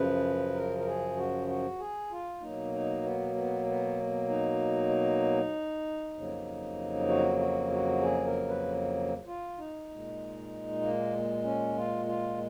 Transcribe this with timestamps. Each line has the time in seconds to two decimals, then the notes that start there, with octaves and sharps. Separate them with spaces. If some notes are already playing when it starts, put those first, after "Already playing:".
Already playing: F#2 C#3 F3 B4
0.54 A#4
0.78 A#4
0.86 G#4
1.17 F#4
1.48 F#4
1.79 G#4
2.11 F4
2.41 B2 F#3 A#3 D#4
2.73 D#4
3.03 B3
3.35 B3
3.66 B3
4.29 D#4
6.14 F2 C#3 F#3 A#3
7.08 F#4
7.39 F#4
7.71 F#4
8.02 G#4
8.26 A#4
8.48 B4
9.26 F4
9.58 D#4
9.89 A#2 G#3
10.82 A#3
11.44 C#4
11.76 F4
12.06 F4